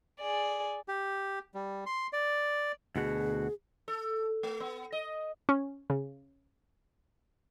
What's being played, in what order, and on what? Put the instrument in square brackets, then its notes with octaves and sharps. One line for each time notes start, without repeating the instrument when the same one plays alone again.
[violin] G#4 D5
[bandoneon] G4
G3
C6
D5
[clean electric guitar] D2 B2 F#4 [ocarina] G#4
[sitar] A4
A3
B3
D#5
[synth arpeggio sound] C#4
C#3